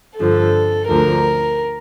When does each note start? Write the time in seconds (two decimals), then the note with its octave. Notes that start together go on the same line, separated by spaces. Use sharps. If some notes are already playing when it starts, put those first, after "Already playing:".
0.20 G2 D3 F3 A4
0.89 D2 D3 F3 A#4